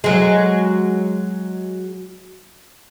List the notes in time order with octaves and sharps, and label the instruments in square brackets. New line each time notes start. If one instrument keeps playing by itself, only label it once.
[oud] F#3 G#3